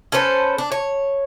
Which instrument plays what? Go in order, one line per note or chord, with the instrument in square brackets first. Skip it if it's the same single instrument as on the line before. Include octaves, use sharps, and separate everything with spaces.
[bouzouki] C#4 A4 B4 C5
D4
C#5